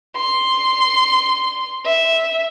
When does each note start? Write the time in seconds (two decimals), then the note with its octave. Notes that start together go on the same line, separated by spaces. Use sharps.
0.16 C6
1.85 E5